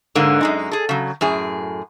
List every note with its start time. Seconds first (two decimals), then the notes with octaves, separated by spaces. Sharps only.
0.15 G#2 D3 G#3 A#3
0.41 F#2 G#3 D#4
0.71 G#4 A4
0.89 C#3 F#3
1.21 F#2 A2 G#4